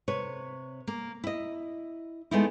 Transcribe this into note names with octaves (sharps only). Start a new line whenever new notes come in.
C3 B4 C#5
A#3
E4 D#5
G#3 A3 B3 D#4 E4